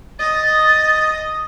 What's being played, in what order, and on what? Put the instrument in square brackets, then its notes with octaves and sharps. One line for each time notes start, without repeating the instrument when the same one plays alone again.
[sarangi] D#5 [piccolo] A6